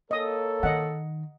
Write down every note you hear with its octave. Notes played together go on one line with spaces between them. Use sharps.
A#3 A4 C#5 D#5 D#6
D#3 D#5 F#5